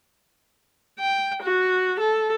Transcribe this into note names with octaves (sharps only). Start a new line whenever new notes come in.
G5
F#4
A4